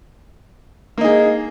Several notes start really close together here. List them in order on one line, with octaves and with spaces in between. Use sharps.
A#3 D#4 G#4